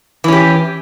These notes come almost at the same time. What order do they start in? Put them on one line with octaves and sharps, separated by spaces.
E3 C#4 G4